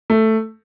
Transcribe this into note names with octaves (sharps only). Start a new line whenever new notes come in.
A3